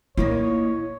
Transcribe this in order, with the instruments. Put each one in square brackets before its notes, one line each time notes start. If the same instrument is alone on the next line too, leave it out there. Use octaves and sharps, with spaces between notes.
[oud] A#2 D#3 A#3 [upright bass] E4 [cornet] C#5